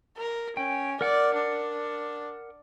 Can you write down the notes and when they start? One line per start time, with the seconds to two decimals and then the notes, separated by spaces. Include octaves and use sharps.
0.18 A#4
0.57 C#4 G5
1.01 A#4 D5 F#5 D6
1.35 D4